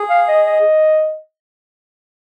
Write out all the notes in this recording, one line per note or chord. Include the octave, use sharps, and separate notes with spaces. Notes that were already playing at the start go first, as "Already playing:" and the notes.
Already playing: G#4
F5
D#5
D#5